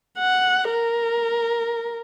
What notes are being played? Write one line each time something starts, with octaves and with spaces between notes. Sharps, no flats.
F#5
A#4